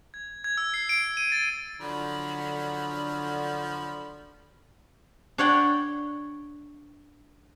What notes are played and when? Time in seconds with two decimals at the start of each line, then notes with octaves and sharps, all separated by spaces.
0.14 G#6
0.44 G#6
0.57 E6
0.74 C7
0.89 D7
1.17 D#7
1.32 A6
1.81 D3 F3 F#3 B5
5.38 D4 C#5 F#5 G5